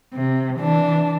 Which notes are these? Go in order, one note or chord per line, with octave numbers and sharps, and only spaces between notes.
C3
E3 D4